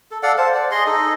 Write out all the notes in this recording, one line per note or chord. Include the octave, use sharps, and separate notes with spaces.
A4
A4 D5 F5 F#5
C5 A5
D5
G#4 D#5 C6
D#4 A4 D#5